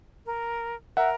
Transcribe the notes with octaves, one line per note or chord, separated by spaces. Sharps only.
A#4
A#4 E5 F#5